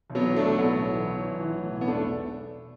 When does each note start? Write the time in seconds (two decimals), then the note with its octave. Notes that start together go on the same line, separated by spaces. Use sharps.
0.10 B1
0.15 F#3 B3
0.26 E3
0.36 A3 D4
0.42 B1
0.58 A2 F#3 B3
0.74 B1
0.91 E3
1.06 B1
1.23 E3
1.39 E3
1.55 A2
1.72 B1
1.81 B3
1.87 E1 A3 D4